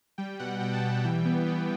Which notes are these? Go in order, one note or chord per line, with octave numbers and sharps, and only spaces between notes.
G3 G5
B2 F#5
B2 G5
A5
G3 G5
E3 G5
B3
B3